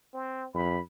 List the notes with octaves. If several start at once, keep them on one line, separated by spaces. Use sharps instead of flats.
C4
F2 B5